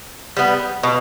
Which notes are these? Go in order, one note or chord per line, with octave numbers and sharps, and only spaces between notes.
G3 B3
B2